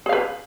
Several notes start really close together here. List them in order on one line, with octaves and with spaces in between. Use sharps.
G#4 F5 B4